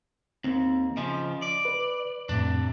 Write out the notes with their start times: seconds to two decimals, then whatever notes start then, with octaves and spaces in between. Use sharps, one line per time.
0.44 D#2 C4
0.97 C#3 F3 D#5
1.42 D5
1.65 B4
2.29 F2 A2 C3 D4